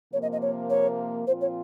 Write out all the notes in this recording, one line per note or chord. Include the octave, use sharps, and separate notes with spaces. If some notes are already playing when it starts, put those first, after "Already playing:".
C3 F3 A#3 C#5
D#5
D#5
C#5
C#5
A#2 F3 C4 F4 C5
C#5